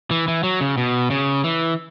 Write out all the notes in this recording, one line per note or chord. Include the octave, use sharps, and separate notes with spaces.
E3
E3
F#3
C#3
B2
C#3
E3